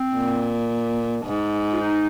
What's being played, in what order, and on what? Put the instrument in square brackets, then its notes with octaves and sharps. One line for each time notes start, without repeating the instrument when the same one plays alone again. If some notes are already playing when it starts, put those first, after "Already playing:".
Already playing: [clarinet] C4
[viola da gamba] A#2
G#2
[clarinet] F4
D#4